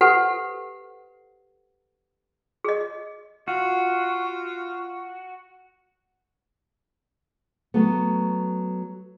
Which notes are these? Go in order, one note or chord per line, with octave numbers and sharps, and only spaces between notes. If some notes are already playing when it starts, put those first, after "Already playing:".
G4 A4 B4 C5 F#5
G#4 D#5
F4 F#4
F#3 A3 B3